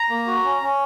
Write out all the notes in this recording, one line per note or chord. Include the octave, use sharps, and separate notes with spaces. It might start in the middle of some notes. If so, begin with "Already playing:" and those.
Already playing: A#5
A#3
F#4
C#4
C#4